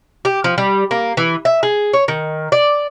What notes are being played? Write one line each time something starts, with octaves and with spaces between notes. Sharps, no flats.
G4
F3
G3
A#3
E3
E5
G#4
C#5
D#3
D5